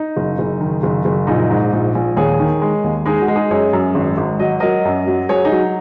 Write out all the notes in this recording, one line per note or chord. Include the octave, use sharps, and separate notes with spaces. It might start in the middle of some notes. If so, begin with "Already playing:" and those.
Already playing: D#4
F#1
F#1
D#3
F#1
F#1
A#1 D#4
G#2
A#1
A#1
D#2 G#4 C#5
D#3
G#3
D#2
G#3 D#4 G#4
F#4
G#3
D#4 G#4
F#2 G#4 C#5
F#2
G#1
G#1
F#3 D#5
F#3 A#4 D#5
F#2
F#3
F#3 G#4 C#5
D#4 G#4
F#3